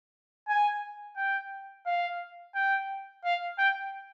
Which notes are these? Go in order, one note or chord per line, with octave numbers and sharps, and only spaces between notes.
G#5
G5
F5
G5
F5
G5